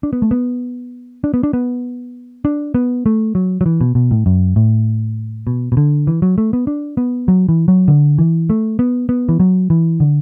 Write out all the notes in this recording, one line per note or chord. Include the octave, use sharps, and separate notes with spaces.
D4
B3
A3
B3
D4
B3
D4
B3
D4
B3
A3
F#3
F#3
E3
B2
B2
A2
F#2
A2
B2
B2
D3
E3
F#3
A3
B3
D4
B3
F#3
E3
F#3
D3
E3
A3
B3
B3
E3
F#3
E3
D3